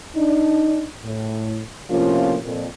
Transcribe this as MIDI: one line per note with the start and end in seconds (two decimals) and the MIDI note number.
0.16 0.84 62
0.16 0.84 63
1.05 1.60 45
1.90 2.37 45
1.90 2.37 48
1.90 2.37 53
1.90 2.37 58
1.90 2.37 61
1.90 2.37 65
2.44 2.66 41
2.44 2.66 46